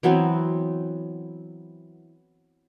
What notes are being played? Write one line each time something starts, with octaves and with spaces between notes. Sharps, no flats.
E3 F#3 B3 C4